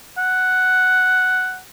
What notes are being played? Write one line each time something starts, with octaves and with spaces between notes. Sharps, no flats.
F#5